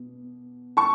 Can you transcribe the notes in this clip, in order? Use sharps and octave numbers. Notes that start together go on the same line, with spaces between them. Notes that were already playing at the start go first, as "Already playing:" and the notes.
Already playing: B2
A5 C#6